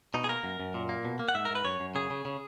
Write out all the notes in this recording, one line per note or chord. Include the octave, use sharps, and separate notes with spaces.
B2 D#4
G#4
A#3 A#4
F#2
F#2
A#2
A#3
B2
A#3
F#5
G#2 E5
A#4
G#2
B4
F#2 C#5
F#2
C#3 G#4
C#3
C#3